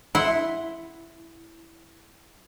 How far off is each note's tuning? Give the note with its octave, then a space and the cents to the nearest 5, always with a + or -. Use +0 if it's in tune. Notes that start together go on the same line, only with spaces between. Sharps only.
E4 +0 F#5 +0 C6 +0